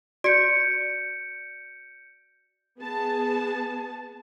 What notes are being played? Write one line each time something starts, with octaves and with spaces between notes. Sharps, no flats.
F#4 D5 G6 C#7 D7
B3 G#4 A5